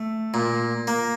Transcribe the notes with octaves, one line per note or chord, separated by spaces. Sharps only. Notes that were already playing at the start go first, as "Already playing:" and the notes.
Already playing: A3
A#2
A#3